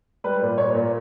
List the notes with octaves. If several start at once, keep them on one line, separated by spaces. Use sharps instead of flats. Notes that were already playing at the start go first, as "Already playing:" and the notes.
G3 B4
A#2
A#2 C#5
A#2